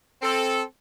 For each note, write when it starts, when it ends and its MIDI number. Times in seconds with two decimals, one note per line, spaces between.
0.22 0.61 60
0.22 0.61 69